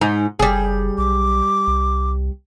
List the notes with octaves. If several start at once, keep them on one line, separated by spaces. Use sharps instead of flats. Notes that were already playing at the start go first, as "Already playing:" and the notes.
G#2 D#4
F#1 G3 G#4
B1 D6
C2